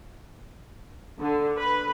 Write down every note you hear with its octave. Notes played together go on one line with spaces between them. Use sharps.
D3
B4